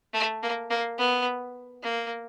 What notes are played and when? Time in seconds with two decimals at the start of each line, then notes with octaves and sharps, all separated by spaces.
0.14 A3
0.43 A#3
0.70 A#3
0.98 B3
1.83 A#3